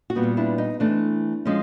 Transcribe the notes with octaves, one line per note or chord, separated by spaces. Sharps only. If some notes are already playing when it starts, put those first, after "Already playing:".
F#4
A#2 G3 B3
F4
D4 E4
D#4
E3 A3 C4 D4
F3 G#3 C#4